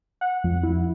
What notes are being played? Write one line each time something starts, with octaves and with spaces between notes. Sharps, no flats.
F#5
F2
E4